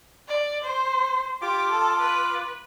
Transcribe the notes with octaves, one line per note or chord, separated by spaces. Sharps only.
D5
C5
F4 G4 D6
A4
B4